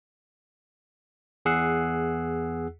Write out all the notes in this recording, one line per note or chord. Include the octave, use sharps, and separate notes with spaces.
E2 G#4 F#5 E6 F#6 C7